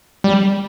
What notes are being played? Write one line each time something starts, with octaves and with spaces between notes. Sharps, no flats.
G3